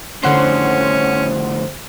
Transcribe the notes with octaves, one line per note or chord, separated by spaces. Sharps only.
F2 A2 D3 C#4 C5 F#5 C6